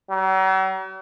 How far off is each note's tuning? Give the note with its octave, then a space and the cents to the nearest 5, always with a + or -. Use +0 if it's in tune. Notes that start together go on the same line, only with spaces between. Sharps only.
F#3 +45